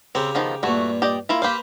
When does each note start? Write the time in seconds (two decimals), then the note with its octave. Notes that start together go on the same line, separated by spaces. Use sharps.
0.15 C#3 C4 G4 A#4
0.35 D#3 F3 B3
0.63 G2 A#2 A3 F#4
1.02 G4 D5 D#5
1.29 A#3 E4 F4
1.42 A#3 G4 B4 C5 F5